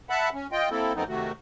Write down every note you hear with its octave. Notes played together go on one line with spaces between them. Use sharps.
E5 F#5 A5 B5
C#4
F4 D#5 G5
A#3 C4 E4 A4
F#2 F3 A3 B3 C4 D#4
C3 D#3 A3 F#4